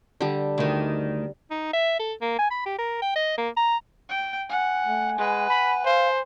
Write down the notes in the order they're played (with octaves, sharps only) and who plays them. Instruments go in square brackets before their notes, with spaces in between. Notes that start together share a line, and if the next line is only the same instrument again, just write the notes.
[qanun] D3 G3
[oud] D2 D#3
[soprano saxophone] D#4
E5
A4
A#3
G#5
B5
G4
A#4
G5
D#5
A#3
A#5
[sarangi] G5
[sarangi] F#5 [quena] G#5
[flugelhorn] A3
[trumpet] G#3 [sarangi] B4 [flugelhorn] F#5
[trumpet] B5
[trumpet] C5 [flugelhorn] F5